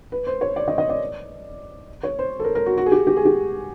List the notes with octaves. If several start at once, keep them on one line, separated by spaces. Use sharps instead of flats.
B4
C5
C#5
D5
D#5
D#5
D5
C#5
C5
A4
A#4
A#4
F#4
F#4
G#4
G4
G4
G#4
G4